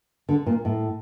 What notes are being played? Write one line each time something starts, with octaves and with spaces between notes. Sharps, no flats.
D3
A#2
A2